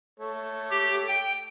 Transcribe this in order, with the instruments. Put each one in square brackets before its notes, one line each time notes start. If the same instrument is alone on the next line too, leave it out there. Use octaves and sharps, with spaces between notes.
[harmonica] A3 C#5
[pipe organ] G4
G5